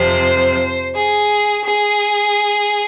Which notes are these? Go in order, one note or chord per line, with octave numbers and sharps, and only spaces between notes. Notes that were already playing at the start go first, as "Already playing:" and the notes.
Already playing: F2 C3 F3 C5
G#4
G#4